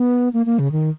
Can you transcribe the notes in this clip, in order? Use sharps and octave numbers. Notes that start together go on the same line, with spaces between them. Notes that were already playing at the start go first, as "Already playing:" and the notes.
Already playing: B3
A#3
A#3
C#3
D#3